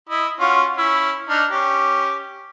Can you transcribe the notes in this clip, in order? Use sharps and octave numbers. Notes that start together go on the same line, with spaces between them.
E4 D#5
C#4 F4 F#4
C#4 E4
D4 D#4 F6
C#4 G4